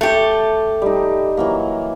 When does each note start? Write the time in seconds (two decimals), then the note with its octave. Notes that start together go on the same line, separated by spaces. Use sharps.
0.01 A3 G4
0.82 G3 D#4
1.37 E3 F#3 A#3